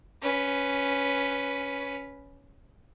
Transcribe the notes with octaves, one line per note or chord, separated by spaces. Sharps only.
C#4 B4